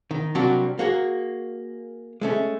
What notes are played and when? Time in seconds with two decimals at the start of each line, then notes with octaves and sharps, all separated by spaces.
0.11 D#3
0.35 C3 F#3 G3 A#3 D4 F#4
0.79 A#3 F#4 G#4
2.21 G#3 A3 C#4